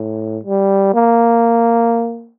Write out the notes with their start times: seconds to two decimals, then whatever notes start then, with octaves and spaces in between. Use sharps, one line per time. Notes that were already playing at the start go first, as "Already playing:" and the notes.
Already playing: A2
0.43 G3
0.94 A#3